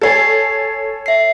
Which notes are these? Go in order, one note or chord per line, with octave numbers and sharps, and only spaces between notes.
A4 C#5 G#5 A6 C7
E5 C7